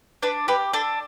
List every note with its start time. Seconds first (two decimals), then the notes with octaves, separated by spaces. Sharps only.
0.23 D4 B4
0.48 G4 B4
0.73 D4 A4